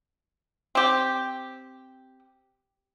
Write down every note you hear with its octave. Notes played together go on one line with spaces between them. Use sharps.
C4 G4